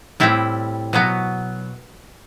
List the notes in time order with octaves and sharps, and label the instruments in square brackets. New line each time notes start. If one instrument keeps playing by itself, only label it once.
[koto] A2 G3 C4 E4
B2 F#3 B3